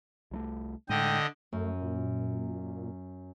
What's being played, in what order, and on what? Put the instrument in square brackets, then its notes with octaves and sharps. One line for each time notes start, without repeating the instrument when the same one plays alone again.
[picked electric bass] C2 F#3 A3
[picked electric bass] A2 G#3 [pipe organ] D3 D#5 [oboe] G5
[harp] F#2 [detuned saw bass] A3
[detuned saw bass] A#2